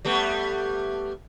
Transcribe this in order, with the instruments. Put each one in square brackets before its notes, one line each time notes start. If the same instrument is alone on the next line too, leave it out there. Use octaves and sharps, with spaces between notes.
[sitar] G3 A3 B3